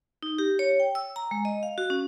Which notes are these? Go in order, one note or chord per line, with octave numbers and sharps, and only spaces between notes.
D#4
G4
C#5
G5
E6
A#5
G#3
D#5
F5
F#4
C#4